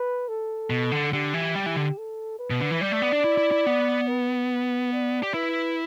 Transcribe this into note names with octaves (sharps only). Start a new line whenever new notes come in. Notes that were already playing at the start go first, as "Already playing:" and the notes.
Already playing: B4
A4
B2
D3
D3 G4
E3
G3
E3
D3
A4
B4
B2
D3
E3
G3 D5
A3
B3
D4
E4
E4
E4
B3
B4
D5
G4
E4 B4